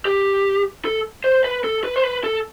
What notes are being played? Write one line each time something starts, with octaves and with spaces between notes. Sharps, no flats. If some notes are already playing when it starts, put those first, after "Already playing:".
G4
A4
C5
B4
A4
B4
C5
B4
A4